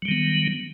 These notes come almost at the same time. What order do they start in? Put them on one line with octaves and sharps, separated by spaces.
F#3 G3 D#3 B3